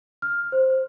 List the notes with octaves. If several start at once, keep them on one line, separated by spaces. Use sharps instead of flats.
F6
C5